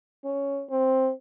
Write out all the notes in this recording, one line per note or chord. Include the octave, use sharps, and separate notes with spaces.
C#4
C4